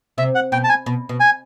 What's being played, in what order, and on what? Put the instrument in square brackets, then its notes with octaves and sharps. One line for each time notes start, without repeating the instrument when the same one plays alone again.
[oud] C3 [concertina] E5
[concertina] F#5
[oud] B2 [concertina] G5
[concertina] A5
G#5
[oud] B2
B2
[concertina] G#5